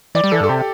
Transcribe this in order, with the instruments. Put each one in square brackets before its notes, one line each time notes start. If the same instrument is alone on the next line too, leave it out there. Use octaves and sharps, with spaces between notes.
[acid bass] E3 [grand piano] D5
[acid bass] G3
[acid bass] E3 [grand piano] A4
[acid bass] G2
[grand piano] A4
[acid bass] C3 [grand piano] G4